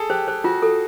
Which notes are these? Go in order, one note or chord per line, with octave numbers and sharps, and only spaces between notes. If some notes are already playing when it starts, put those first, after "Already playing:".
Already playing: G#4 A4
G4 C5
G4 C5
F4 F#4
A4